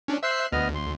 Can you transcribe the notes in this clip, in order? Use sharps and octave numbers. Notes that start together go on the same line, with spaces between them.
C#4 D4
C5 E5 E6 F#6 C7
D2 B3 D#5 F6
C6